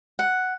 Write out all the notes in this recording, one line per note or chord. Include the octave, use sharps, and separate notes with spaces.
F#5